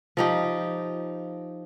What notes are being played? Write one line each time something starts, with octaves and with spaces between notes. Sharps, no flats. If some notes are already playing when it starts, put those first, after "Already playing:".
F3 D#4 G4